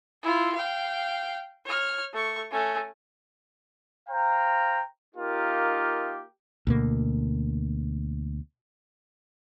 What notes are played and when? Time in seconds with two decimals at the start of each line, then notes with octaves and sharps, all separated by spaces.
0.22 E4 F4
0.54 F5 G5
1.65 C#5 F6
2.13 A3 C#6
2.51 A3 C#4
4.09 C5 F5 G5 A#5
5.15 A#3 D#4 F4 G4 A#4
6.67 D2 B2 A#3